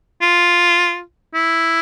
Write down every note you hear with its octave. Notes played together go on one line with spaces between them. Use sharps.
F4
E4